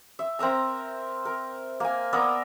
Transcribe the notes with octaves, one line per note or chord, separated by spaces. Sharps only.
E5
C4 A#4 E5 A#5
A#4
A#3 G#5
B3 A#4 D5 E6